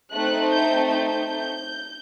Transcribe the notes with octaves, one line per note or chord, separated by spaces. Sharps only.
A3 C4 D#4 F#6
G6
G6